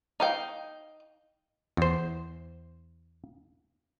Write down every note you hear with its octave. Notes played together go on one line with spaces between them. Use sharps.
D#4 F5 G5
E2 C5